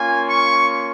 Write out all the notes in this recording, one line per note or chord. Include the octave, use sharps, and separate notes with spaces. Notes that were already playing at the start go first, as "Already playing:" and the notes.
Already playing: A#3 C#4 F4 G#5
C#6